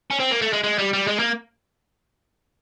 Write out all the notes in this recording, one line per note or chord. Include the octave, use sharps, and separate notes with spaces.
C#4
C4
A#3
A3
G#3
G#3
G3
G3
G#3
A#3